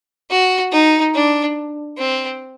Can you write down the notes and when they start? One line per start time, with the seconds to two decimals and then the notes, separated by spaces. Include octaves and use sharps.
0.30 F#4
0.72 D#4
1.14 D4
1.98 C4